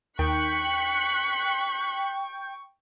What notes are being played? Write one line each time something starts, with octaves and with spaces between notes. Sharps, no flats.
D#2 G5 C#6 F#6 B6 C#7